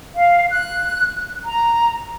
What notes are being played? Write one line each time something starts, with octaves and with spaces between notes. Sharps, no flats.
F5
F#6
A#5